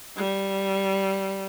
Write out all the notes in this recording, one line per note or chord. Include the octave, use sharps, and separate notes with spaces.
G3